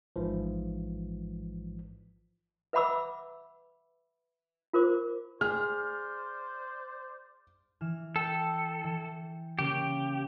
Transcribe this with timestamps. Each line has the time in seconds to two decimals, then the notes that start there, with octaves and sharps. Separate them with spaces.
0.16 A1 G#2 E3 F3
2.73 B4 E5 F#5 B5 D6 E6
4.73 F4 A#4 C5 D6
5.41 G#4 C5 D5 F6
7.81 E3 F6 E7
8.16 A4 G5
8.84 E3
9.59 C#3 G3 A#3 G4